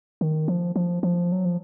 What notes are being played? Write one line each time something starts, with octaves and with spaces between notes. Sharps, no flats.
D#3
F3
F3
F3
F#3
F3